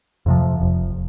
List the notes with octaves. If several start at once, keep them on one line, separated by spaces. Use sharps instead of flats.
F2 C3 F3
F1